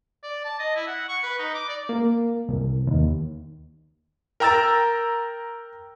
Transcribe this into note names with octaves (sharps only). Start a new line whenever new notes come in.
D5
A5
D#5
E4
F#5
C#6
B4
D#4
D6
D5
A#3
C2
D#2
A#4 G5 A#5 E6 A6